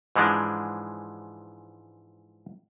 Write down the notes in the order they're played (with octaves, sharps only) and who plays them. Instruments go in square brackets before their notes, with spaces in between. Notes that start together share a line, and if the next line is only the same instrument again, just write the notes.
[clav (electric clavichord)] G#2 E3 F3 G#3 D4